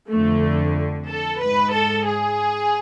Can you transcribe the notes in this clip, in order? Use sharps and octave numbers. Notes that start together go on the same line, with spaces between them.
F2 D3 A3
A4
G#2 B4
A4
G#4